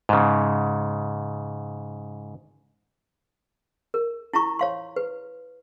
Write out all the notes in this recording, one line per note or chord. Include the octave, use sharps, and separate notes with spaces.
G#2 C#3
A#4
E4 F4 A#5 C#6
C#5 F5 C6
B4